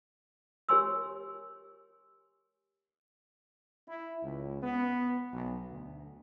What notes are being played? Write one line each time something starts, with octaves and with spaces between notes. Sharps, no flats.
G4 A#4 C#5 G#5 C6 E6
E4
C#2
B3
B1
D2